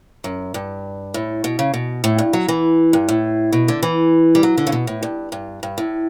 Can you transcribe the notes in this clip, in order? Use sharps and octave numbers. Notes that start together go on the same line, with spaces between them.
F#2
G2
A2
B2
C#3
B2
A2
G2
F#3
E3
G2
A2
B2
D3
E3
G3
F#3
D3
C#3
B2
A2
G2
G2
G2
A2